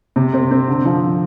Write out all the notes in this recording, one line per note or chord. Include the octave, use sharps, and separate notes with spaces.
C3
C4
C4
D3
F3